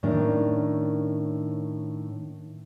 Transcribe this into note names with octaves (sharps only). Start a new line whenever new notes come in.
A2 D#3 C#4 D4 D5